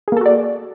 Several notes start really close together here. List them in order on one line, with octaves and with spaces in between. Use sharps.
G#4 A#3 A4 F#4 D5